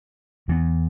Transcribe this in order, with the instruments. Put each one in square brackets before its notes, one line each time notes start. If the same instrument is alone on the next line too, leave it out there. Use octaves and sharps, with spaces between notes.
[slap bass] E2 E3 B3